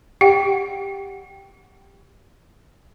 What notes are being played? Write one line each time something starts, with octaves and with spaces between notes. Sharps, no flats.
G4 F#5 G5